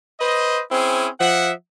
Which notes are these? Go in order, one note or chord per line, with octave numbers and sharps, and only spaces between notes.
B4 C5 D#5
C4 C#4 E4 G#4
F3 E5 F#5